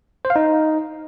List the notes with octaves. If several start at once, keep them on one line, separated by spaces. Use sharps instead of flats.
C5
F5
D#4